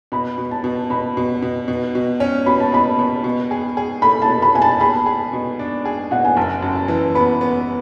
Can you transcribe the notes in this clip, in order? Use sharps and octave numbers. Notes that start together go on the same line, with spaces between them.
B2 B5
B2
A5
B2
B2 B5
B2
B2
B2
B2
C#4
B2 B5
A5
B2 B5
B2
B2
G#4
G#4
A3 B5
A5
B2
B5
B2 G#5
A5
G#4 B5
G#4
B2
D4
G#4
B2 F#5
G#5
F#1 A5
F#2
A5
E3
B3 B5
B3